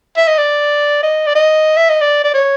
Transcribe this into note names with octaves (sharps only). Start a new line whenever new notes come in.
E5
D#5
D5
D#5
D5
D#5
E5
D#5
D5
D5
C#5